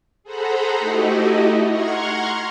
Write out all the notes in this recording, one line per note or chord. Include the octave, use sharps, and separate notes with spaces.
G#4 A4 C5 F#5 A#5 B5
A3 D#4 E4 F#4 G4 D#5
F#5 A#5 C6 C#6 F6 G#6